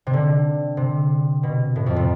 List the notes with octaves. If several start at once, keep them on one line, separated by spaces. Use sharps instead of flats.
C3
D3
C3
B2
A2
F2
C3